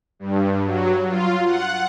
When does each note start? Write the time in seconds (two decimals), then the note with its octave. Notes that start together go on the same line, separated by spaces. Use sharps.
0.19 G2
0.64 F#3
1.08 F4
1.46 F#5